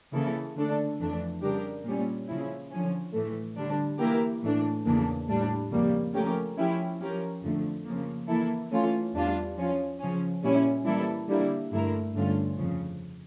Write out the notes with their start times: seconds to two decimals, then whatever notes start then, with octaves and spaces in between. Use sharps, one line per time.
0.13 C#3 E3 A#3 E4 A4
0.56 D3 A3 D4 A4
0.99 F2 E3 A3 D4
1.42 C#3 G3 D4 G4 A#4
1.84 A#2 G3 C#4
2.28 C#3 F3 C#4 E4
2.71 D3 F3 C#4
3.13 A2 E3 A3
3.56 D3 G3 D4
3.99 E3 A#3 E4 G4 A#4
4.42 A2 E3 A3 D4
4.85 E2 C#3 E3 A#3 D4
5.28 A2 G3 D4
5.71 F2 C#3 G3 A#3
6.13 F3 A3 C#4 G4 A#4
6.57 F3 C#4 E4 G4
6.99 F3 C#4 G4 A#4
7.42 F2 D3 F3 A3
7.85 C#3 F3 A#3
8.28 E3 A#3 E4 A4
8.71 E3 A3 C#4 F4
9.14 E2 E3 G3 D4 F4
9.57 F3 C#4 F4
9.99 C#3 F3 C#4
10.43 A#2 G3 C#4 E4
10.85 E3 G3 A#3 E4 A4
11.28 D3 G3 A#3 E4
11.72 G2 D3 A3 E4 A#4
12.14 G2 D3 A3 C#4 F4
12.57 F2 C#3 F3